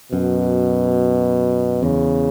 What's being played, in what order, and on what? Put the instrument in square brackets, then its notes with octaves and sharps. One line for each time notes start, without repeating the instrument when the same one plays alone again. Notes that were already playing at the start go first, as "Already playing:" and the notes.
[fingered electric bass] F#2 [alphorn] B2
[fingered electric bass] E2 [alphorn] C#3